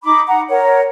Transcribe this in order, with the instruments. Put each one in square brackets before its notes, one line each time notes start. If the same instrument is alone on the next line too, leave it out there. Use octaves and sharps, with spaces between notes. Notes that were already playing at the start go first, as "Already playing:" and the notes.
[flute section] D#4 B5 D6
F#5 A#5
A#4 C#5 F#5